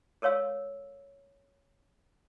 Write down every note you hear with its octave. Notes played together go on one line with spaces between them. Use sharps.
A4 A#4 C#5 F5 E6